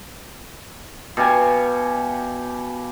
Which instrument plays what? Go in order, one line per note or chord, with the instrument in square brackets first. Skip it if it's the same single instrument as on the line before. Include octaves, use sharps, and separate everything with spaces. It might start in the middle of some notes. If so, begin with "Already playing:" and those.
[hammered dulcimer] B2 G4 F5 G#5